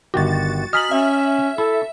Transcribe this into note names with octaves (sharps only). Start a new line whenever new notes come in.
G1 D#3 F#4 G4 A6
D#5 G#5 A#5 F6 B6 F#7
C#4 E5
E4 A4